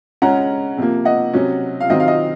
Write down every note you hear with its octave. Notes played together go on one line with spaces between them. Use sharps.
C#3 G#3 C#4 F#5 A#5
C3 F3 A#3
D#5 F#5
C3 F#3 C#4
F5
D#3 F#3 C4 D#5
F5
D#5